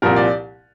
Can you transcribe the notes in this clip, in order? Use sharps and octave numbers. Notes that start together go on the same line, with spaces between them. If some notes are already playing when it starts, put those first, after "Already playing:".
C2 A#2 F3 A#4
D5